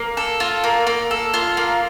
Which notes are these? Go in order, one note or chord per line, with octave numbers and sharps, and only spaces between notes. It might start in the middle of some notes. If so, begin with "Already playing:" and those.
Already playing: A#3
A4
F4
A#3
A#3
A4
F4
A#3